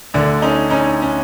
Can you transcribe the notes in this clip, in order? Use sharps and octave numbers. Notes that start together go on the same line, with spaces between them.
D2 D3 D4
C#4 D#4
C#4 D#4
C#4